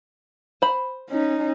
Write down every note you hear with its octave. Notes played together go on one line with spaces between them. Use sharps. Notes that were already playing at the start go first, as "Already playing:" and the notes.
C5 B5
C#4 D#4